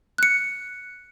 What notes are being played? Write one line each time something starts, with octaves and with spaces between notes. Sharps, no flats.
F#6 C#7